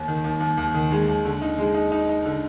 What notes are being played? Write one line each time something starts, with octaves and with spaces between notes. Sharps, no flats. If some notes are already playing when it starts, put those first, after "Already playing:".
Already playing: D#2
D#3
D#2
D#2
D#2
D#3
G#3
D#2
D3
D#4
G#3
D#4
D#4
D#4
D3